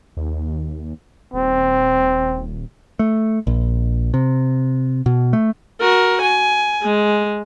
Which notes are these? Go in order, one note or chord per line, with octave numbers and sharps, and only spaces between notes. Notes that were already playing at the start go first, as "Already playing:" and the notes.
D#2
D#1 C4
A3
A#1
C3
B2
A3
F#4 A#4
G#5
G#3